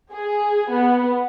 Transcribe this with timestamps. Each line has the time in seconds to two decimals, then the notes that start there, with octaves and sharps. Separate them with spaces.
0.12 G#4
0.72 B3